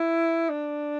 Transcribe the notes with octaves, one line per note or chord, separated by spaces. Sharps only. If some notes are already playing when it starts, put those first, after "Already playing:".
Already playing: E4
D4